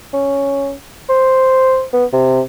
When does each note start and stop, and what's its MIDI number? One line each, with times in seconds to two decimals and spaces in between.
0.13 0.73 61
1.09 1.84 72
1.93 2.05 59
2.13 2.41 48